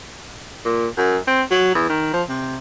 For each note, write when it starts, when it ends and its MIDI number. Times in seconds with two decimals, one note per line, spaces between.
0.65 0.87 46
0.97 1.17 42
1.27 1.42 60
1.51 1.73 54
1.75 1.87 40
1.89 2.09 51
2.13 2.23 53
2.29 2.58 48